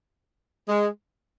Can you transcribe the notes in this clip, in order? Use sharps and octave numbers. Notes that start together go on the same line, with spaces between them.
G#3